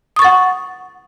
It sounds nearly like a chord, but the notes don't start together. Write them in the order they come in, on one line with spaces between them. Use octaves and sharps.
D#6 C#6 A6 F#5